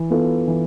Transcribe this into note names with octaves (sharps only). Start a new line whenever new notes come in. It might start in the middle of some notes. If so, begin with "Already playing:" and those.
Already playing: E3
B3 F4 A4
E3